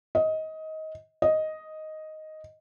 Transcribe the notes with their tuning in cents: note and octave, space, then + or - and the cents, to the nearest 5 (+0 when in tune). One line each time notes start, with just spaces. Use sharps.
D#5 +20
D#5 +5